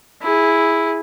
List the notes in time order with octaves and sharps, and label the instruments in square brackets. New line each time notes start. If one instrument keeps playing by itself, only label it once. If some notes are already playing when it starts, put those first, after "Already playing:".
[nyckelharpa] E4 G#4